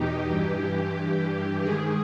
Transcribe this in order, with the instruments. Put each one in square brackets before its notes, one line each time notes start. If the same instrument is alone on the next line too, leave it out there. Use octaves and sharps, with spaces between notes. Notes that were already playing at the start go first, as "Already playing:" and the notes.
Already playing: [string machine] E2 B2 D#4 G4
G2 E3
G2 E3
G#2 D#3 G#4